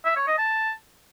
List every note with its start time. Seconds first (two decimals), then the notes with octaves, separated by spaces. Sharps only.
0.05 E5
0.16 C#5
0.27 D#5
0.39 A5